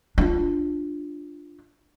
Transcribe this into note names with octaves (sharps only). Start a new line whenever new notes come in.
D4 F4